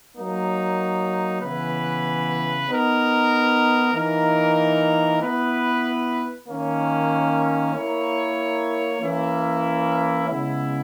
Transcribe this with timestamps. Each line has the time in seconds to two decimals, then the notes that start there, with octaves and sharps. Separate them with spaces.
0.15 F#3 A#3 D#4
1.41 C#3 E3 B3 E4 B4
2.68 B3 D#4 A#4
3.94 E3 A#3 D#4 A#4
5.21 B3 E4 B4
6.48 D#3 A#3 C#4
7.75 A#3 E4 A#4 C#5
9.01 E3 A#3 C#4 E4
10.28 C#3 G#3 B3 E4